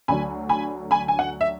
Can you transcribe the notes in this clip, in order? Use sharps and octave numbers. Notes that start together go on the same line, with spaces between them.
D2 D3 F#3 G#5 B5
G#5 B5
G#5 B5
G#5
F#5
E5